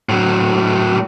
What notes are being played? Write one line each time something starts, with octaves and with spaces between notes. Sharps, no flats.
A2 F#3